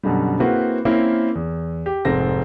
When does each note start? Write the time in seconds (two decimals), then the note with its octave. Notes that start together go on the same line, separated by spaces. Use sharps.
0.03 F#2 B2 D3 G3
0.40 A#3 C4 E4 F#4 G#4 B4
0.85 A#3 C4 C#4 E4 A#4
1.35 E2
1.86 G4
2.05 F1 G#2 C4 A4 A#6